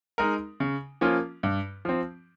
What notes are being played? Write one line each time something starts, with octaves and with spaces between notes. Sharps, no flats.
G#3 D#4 A#4
C#3
F3 A#3 C#4 F4
G2
F3 C4